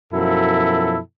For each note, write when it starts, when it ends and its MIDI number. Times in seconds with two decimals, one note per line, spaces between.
0.13 0.99 42
0.13 0.99 47
0.13 0.99 53
0.13 0.99 64
0.13 0.99 69